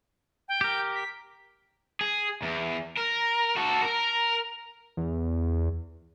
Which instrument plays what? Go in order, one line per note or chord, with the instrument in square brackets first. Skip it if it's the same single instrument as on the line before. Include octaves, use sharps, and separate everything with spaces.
[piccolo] G5
[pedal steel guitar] G4 A#4
[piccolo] B6
[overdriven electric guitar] G#4
E2
A#4
F#4 A4
A#4
[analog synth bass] E2